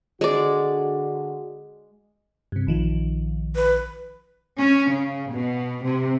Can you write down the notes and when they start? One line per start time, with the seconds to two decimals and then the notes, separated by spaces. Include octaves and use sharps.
0.21 D3 G#3 F#4 D5
2.52 G2 C3
2.67 A#1 D#3 F3
3.55 B4
4.60 C#4
4.92 C#3
5.31 B2
5.84 C3